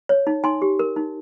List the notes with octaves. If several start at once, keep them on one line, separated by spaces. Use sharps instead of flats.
C#5
D#4
D#4 G#5 C6
G4
A#4
D#4